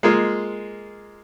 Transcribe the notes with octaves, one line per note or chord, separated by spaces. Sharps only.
G#3 A#3 F4 G#4